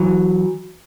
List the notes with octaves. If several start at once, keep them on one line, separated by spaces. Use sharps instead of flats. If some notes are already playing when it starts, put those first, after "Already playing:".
Already playing: E3 F#3